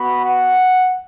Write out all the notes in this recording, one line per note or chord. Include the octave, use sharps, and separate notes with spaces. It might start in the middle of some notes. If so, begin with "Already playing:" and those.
Already playing: B3 F#4 B5
F#5